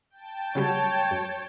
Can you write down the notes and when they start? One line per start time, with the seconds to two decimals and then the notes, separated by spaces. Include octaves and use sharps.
0.10 G5 A5
0.55 C#3 F#3 G3 C#5
1.11 F#2